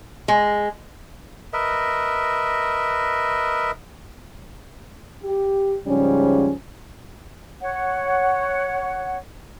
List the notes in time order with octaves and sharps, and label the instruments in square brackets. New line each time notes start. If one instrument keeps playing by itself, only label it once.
[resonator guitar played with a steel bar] G#3
[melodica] A#4 B4 D#5 E5
[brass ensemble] G4
G#2 C#3 F3 G3 C#4
[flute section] C#5 F#5